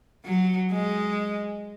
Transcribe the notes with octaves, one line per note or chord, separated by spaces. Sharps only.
F#3
G#3